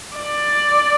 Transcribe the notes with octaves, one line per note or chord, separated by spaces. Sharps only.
D5